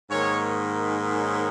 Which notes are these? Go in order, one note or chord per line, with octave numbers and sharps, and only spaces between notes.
G#2 D#3 A#3 C#5
C#5